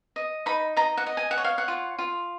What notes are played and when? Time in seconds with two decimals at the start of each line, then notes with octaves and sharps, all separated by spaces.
0.16 D#5
0.46 D#4 B5
0.77 D#5 A#5
0.97 F#5
1.06 D#5
1.17 G#5
1.31 F#5
1.38 C#5
1.44 F5
1.58 F#5
1.68 F4
1.99 F4